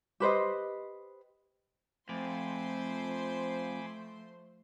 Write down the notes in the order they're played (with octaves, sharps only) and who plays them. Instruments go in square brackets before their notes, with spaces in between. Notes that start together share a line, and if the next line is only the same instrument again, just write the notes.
[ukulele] G4 B4 C5 D#5
[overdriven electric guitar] F2 [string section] F3 C5 C6 [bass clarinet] A3 [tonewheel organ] G#5 B5 D6